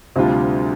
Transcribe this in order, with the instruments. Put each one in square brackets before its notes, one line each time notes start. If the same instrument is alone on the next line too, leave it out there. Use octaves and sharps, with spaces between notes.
[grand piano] D2 C3 G3 D4 F4